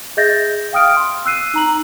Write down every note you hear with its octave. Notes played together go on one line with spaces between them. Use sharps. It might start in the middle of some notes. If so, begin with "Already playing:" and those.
G#4 D#5 E5 G6 A6 A#6
F5 G5 D#6 F6 D7
C6
E6 F#6 C7 D#7
D#4 A#5 F#7